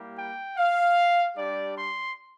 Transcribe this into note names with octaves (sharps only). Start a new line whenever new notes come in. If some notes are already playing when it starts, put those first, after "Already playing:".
Already playing: G3 A#3 E4 G4
G5
F5
G3 D4 G4 D5
C6